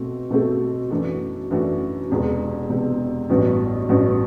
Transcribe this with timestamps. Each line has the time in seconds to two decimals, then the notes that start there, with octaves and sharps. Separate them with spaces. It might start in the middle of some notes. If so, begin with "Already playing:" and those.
Already playing: B2 A3 C4 F#4
0.31 B2 A3 C4 F#4 A4
0.91 F#2 E3 A3 D4 F#4
1.50 F#2 E3 A3 D4 F#4
2.10 E1 E2 C3
2.70 E1 E2 C3
3.30 A1 G2 E3 B3 F#4
3.89 A1 G2 E3 B3 F#4